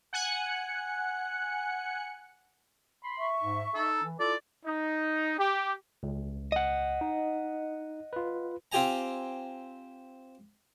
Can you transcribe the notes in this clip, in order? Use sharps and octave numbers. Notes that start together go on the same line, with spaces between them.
F#5 G#5 F#6 C#7
B5 C6
E5 C#6
G#2
D#4 A4
E3
E4 F4 A4 D5 D6
D#4
G4
C#2
D#5 F#5
D#4
F4 B4
C4 F4 G4 D#5 G#5 A#5